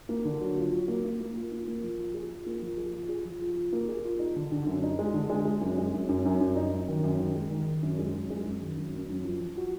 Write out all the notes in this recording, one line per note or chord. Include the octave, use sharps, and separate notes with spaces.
A#3
D3
F#3
F4
F#3
A#3
A#3
A#3
F4
A#3
A#3
F3
F4
G#4
F4
A#3
F3
G#4
F4
G#4
F3
F4
F4
A#3
G#4
F4
D#4
D3
D3
F#2
D#4
G#3
D3
G#3
G#3
F#2
G#3
F#2
F#2
F#2
F#2
D#4
F#2
D#3
F#2
D#3
G#3
D#3
D#3
F#2
G#3
F#2
G#3
F#2
D#3
F#2
F#2
F#2
F3
F3
F#4